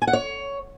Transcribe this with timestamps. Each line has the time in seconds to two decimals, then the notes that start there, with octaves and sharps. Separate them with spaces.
0.02 G#5
0.07 F#5
0.13 C#5